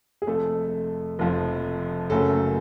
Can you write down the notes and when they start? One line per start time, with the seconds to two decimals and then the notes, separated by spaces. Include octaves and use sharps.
0.22 G#4
0.27 F1 F2 F3 A3 A4
1.19 F1 F2 F3
2.10 F#1 F#2 C#3 F#3 A3 A4